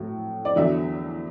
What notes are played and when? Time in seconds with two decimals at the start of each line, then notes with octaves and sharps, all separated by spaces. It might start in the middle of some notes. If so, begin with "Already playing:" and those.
Already playing: A2 F#3
0.45 D5
0.56 E2 D3 F#3 E5